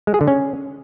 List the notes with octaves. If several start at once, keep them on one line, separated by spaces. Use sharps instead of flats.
G#3
G#4
D3
C#4